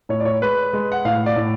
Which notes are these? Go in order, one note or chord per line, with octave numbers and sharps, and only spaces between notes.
A2 C#5
D5
C#5
G#3 B4
G#3
F#5
A2 F5
D5
A2